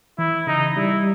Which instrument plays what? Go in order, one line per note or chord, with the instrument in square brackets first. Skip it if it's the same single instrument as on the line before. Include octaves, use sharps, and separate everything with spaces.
[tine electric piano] E3 [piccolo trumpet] E4
[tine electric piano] C#3 [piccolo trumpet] D#4
[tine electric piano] G3 [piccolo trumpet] E4